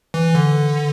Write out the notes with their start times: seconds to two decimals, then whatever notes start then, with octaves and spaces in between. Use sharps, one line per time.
0.14 E3
0.35 D3